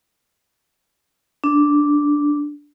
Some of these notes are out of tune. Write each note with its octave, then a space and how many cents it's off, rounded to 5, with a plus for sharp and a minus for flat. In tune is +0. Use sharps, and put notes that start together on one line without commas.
D4 -5